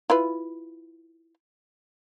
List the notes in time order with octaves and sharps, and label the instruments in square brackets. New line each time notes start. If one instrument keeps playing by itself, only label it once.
[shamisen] E4 F4 B4